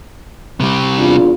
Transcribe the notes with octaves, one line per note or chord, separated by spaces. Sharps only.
C3 G3
E2 D4 F4